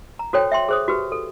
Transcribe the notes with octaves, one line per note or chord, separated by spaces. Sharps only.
A#5
F#4 A4 C5 C#5 G5
E5 G5 C6
G#4 C5 D#6
F#4 G4 B4
A4